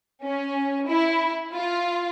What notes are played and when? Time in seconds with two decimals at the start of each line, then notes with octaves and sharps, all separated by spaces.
0.23 C#4
0.89 E4
1.53 F4